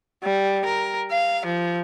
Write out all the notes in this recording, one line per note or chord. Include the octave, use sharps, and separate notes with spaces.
G3
A#4
F5
F3